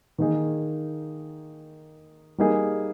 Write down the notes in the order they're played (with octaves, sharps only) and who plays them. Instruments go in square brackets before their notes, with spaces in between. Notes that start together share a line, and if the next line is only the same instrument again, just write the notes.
[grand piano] D#3 A#3 D#4 G#4
G3 A#3 D#4 G#4